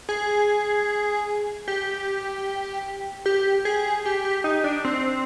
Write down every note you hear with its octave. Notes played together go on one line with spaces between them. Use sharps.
G#4
G4
G4
G#4
G4
G4
D#4
D4
C4